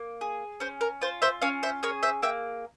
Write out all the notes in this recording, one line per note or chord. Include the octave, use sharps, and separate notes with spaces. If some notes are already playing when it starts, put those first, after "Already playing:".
Already playing: A#3
G#4
C#4 C5
A#4
F4 C5
C5 E5
C#4 C#5 F5
C5 E5
G#4 A#4 C#5
C5 E5
A#3 E5 G5